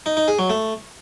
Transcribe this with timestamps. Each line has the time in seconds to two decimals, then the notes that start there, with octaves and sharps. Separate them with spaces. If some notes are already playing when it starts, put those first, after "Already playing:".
0.06 D#4
0.17 D#4
0.28 G#4
0.39 F#3
0.50 A3